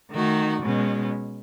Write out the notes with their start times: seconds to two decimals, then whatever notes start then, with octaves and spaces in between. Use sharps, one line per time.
0.13 D#3 A3 D#4 F#4
0.64 B2 G#3 C#4